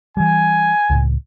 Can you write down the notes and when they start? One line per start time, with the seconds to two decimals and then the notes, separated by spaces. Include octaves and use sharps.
0.17 E3 G3 G#5
0.90 C#2 A2